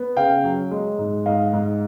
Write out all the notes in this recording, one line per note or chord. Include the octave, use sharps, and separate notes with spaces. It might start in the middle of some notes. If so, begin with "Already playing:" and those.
Already playing: B3
C#3 F5 G5
F#3
G#3
G#2
G#2 D#5 F5
G#2